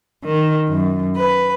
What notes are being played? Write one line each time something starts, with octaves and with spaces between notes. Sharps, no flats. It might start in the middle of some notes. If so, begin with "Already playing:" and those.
D#3
F#2
B4